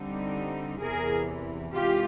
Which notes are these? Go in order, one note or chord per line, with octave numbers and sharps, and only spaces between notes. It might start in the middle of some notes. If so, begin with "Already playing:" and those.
Already playing: D3 G3 C4 D#4
E2 C3 E3 G#4 A#4
C3 E3 G#3 F4 G4